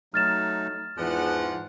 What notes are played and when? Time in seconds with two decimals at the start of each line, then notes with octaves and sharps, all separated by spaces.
0.14 F#3 A3 D#4 F6 A6 E7
0.98 E2 G#2 E3 F3 F#5